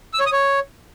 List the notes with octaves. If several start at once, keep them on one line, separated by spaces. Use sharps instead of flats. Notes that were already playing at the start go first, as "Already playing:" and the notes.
E6
C#5
D#6
C#5